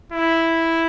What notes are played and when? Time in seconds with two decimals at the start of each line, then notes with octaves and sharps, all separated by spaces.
0.12 E4